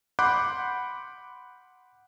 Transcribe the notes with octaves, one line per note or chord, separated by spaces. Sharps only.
F#5 B5 C6 D6 F#6 G6